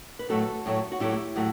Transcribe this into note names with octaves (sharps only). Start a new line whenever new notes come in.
B4
A2 F#3 A3 F#4 A4
A2 F#3 A3
F#4
A2 F#3 A3 E4 G4
A2 F#3 A3